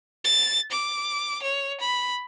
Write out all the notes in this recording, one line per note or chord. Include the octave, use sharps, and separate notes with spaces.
A6
D6
C#5
B5